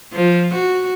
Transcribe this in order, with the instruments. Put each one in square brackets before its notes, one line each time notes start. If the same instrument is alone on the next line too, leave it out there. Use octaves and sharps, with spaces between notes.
[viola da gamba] F3
F#4